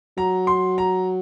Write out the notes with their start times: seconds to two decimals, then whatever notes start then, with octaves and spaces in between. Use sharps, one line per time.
0.17 F#3 A#5
0.47 C6
0.78 A#5